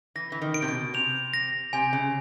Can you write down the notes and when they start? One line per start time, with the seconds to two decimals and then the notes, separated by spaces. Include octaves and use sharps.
0.15 E3 A#6
0.32 E3
0.42 D#3
0.54 D7
0.62 C3
0.68 B2
0.94 C3 F7
1.33 A#6
1.73 C3 G#5
1.93 C#3